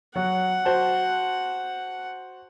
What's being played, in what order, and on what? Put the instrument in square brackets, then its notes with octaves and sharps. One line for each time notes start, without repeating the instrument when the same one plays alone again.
[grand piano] F#3 F#4 [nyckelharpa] F#5
[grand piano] F#4 C5 A5